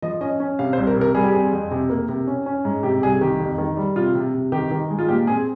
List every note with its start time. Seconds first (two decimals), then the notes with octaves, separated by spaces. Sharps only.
0.02 F3 D#5
0.21 C#4 D#5
0.40 C#4
0.59 C3 F5
0.73 C5
0.77 C2
0.87 A#4
0.96 C3
1.01 A#4
1.15 G3 G#4
1.24 G4
1.32 C4 G#4
1.53 F2
1.71 C3
1.90 A#3
2.09 C3
2.27 C#4
2.46 C#4
2.65 G#2
2.83 C3 G4
3.02 C2 G#4
3.21 D#3 G4
3.40 F2
3.58 D#3
3.77 G3
3.96 C3 F4
4.15 C3
4.34 C3
4.52 D#3 G4
4.71 D#3
4.90 G#3
4.99 F4
5.09 A#2 G4
5.27 C4 G#4